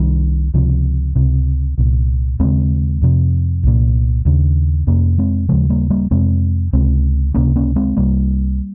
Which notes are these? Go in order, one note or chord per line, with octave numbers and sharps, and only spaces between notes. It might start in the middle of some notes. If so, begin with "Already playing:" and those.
Already playing: C2 C3 D#3 G3
C#2 C3 F3
C#2 C3
C2 A#2
D#2 C#3 G#3 C4
F2 C3
C2 A#2
D#2 C#3
F2 C3 A#3 C#4
G#3 C4
D#2 C#3 F3 G#3
G3 A#3
G3 A#3
F2 C3 G#3 C4
C#2 C3 G#3 C4
C#2 C3 A#3 C#4
A#3 C#4
G#3 C4
C2 C3 G3 A#3